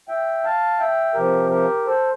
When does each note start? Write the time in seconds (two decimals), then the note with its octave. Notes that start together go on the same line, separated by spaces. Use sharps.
0.08 E5 G5
0.44 F5 A5
0.79 E5 G5
1.14 C3 F3 G4 A#4
1.50 G4 A#4
1.85 A4 C5